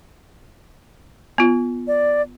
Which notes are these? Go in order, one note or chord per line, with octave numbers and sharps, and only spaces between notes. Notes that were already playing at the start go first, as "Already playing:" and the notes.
B3 F4
D5